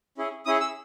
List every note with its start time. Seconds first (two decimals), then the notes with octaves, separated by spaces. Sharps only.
0.18 C#4 E4 G#4
0.46 C#4 E4 G#4 D#6
0.60 E6